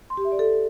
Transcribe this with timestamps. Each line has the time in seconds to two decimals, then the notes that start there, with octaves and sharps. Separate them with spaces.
0.10 C6
0.17 G4
0.25 E5
0.32 D5
0.39 A4